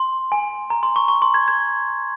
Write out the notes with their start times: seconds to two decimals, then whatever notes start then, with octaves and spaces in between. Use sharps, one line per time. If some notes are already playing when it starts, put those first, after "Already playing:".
Already playing: C6
0.32 G#5
0.70 A#5
0.83 C6
0.96 C#6
1.08 C#6
1.22 C6
1.34 G#6
1.48 G#6